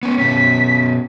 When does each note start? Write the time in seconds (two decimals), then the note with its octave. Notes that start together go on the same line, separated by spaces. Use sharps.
0.03 B3 C#4
0.19 B2 B3 C#4 B6